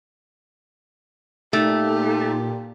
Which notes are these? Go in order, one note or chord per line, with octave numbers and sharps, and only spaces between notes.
A#2 A3 D#4 G4